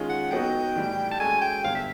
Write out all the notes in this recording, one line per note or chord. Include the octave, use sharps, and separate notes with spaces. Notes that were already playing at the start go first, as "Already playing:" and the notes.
Already playing: D#3 G#3 C#4 F4 G#4
F#5
F#3 B3 D#4 F#4 G5
A2 E3 G3
A5
G#3 C#4 F#4 A4 G#5
G5
G2 D3 G3 B3 F5
E5